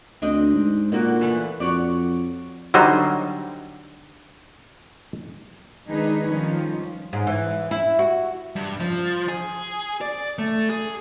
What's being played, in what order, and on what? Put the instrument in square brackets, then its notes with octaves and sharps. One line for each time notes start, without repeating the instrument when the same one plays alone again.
[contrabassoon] D2 [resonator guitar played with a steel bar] C4 D4 D#5
[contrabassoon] G#2
[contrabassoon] A#2 [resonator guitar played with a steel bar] D3 A#3 F#4
[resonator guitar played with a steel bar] E3 A3 B3
[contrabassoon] F2 [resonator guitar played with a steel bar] F#4 C#5 D5
[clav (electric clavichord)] D3 F#3 G3 D#4 C5
[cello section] D#3 G#3 D4 D#4 G#4 B4
D#3 F3 G3 C#4
[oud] G#2
E3
E4
F#4
[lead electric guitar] G2
F3
G#4
D5
A3
G#4